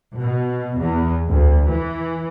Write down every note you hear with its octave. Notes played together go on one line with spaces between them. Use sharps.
B2
E2
D2
E3